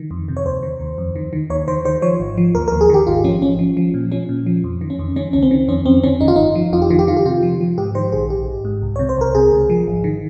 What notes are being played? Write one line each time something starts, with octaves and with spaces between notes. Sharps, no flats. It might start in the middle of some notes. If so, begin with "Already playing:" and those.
Already playing: D#3
F2
C3
C#5
D#2 C5
D#3
D#2
F2
D#3
D#3
D#2 C#5
D#3 C5
D#3 C5
F3 C#5
G#1
F3
D#2 A#4
A#4
D#2
G#4
D#3 G4
G#1 F4
F3 C#4
G#1 C#4
F3
F3
A#2
F3 C#4
A#2
F3
F2
D#3
C#4
F2
D#3 C#4
C#2 C#4
C4
D#3
F2 C#4
F2 C4
D#3 C#4
G1 D#4
F4
G1 D#4
F3
F2 F4
G4
D#3 F4
G4
D#3 F4
G4
C3 F4
F3
F3
G#2 G4
D#3 C5
A#1 G#4
G#1 G4
G#1
G#2
C2
C3 C#5
C5
C2 A#4
C3 G#4
C#2
F3
G#1
D#3